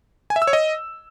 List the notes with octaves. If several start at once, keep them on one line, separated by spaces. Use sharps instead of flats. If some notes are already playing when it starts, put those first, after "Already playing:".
G#5
E5
E6
C#5
D#5